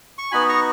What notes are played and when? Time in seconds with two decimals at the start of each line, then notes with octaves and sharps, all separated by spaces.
0.18 C#6
0.31 B3 D#4 F#4 G#5 B5
0.49 A#5 C#6